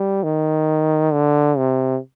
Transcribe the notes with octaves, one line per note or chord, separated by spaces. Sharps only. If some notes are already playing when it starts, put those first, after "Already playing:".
Already playing: G3
D#3
D3
C3